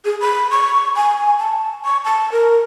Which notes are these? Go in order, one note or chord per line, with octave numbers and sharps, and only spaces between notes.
G#4
B5
C#6
G#5
A5
C#6
A5
A#4